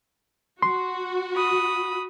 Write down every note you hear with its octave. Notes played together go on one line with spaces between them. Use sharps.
F#4 C6
B5 D#6